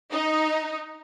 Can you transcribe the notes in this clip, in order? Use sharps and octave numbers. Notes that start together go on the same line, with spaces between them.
D#4